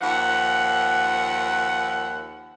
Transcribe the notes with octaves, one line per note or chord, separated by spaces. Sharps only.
D#2 F3 F#5